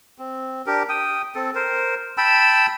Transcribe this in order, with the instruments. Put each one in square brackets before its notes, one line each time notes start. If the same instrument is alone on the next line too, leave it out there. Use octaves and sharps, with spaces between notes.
[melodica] C4
D4 G4 A#4
G5 D#6
C4 A4
A#4 C5
G5 A5 B5 E6